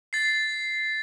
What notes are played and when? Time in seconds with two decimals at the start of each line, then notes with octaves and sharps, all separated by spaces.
0.13 A6 C7